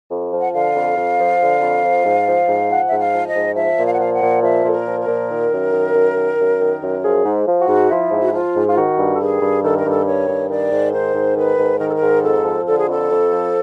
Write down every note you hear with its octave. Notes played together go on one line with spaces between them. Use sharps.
F2
F3
F#5
D3 F5
F2
F2
F3
D3
F2
F3
G#2
F3
G#2
F3 F#5
G#2 E5
F5
F3
D#5
G#2
F3 E5
A#2
F5
F#5
F3 F5
F#5
A#2
F3 E5
A#2 A4
A#4
F3
A#4
A#2
D#3
F#2
D#3
F#2
D#3
F#2
D#3
F#2
F3 G#4
G#2
F3
F#4
G#2
F3 E4
G#2
F#4
F3 F4
G#2
F4
D#3 F#4
G2
A4
D#3 G#4
G2
D#3 A4
A#4
G2
A4
D#3 C#5
G2
D#3 D5
G#2
D#3 C5
G#2
D#3 B4
G#2
D#3 A#4
A4
A#4
G#2
F2 A4
F3
D3 A4
G#4
F2 A4
F2
F3